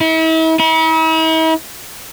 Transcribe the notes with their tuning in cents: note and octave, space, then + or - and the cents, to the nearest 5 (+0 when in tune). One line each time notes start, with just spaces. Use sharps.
E4 -40
E4 -45